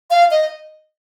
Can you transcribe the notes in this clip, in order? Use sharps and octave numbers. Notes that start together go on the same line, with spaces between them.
F5
D#5